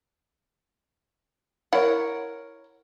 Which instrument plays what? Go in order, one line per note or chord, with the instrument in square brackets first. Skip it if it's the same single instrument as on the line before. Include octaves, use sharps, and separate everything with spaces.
[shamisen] E4 F#5 [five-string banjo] A#4 C#5